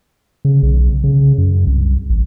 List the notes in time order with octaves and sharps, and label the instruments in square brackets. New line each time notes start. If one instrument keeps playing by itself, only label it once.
[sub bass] C#3
B1
C#3
F#2
C2
A1